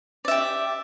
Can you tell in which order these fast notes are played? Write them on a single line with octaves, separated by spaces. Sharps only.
D5 E5 G4